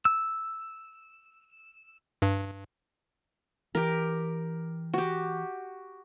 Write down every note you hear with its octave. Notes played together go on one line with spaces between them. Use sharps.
E6
G2
E3 G4 A#4
F#4 G4